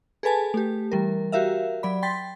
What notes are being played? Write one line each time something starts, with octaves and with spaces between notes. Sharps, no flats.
G#4 A4 B4 G#5 A5
A3 G4
E3 G3 A#4
F#4 G4 A#4 E5 F5
F#3 D5 B5
G5 C6 A6 B6